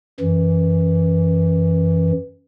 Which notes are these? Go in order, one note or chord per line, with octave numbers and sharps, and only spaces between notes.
F#2 E3